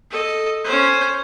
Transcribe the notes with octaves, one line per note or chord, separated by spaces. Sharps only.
A4 D#5
C#4 C5